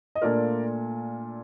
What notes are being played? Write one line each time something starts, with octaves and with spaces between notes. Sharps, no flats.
D#5
A#2 A3 D4 F4 A#4 D5